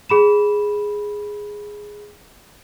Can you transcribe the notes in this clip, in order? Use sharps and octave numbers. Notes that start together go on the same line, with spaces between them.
G#4 B5 E7